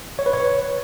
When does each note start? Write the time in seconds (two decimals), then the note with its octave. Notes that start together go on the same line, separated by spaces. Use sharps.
0.19 C#5
0.26 B4
0.33 C#5